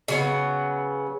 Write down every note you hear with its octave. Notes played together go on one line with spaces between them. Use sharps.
C#3 F#3 B3